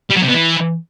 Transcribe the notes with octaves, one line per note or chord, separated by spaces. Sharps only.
G3
F#3
C3
B3
E3